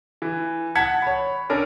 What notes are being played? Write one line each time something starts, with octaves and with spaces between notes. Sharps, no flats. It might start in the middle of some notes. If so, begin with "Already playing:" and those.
E3
F#5 A5 G#6 B6 C#7
C#5 B5
C#4 D4 A4 A#4